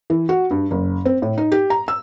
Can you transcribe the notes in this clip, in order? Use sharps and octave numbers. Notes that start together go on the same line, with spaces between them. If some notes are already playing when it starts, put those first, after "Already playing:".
E3
F#4
G2
F#1
C4
A2
D#4
G4
A#5
E6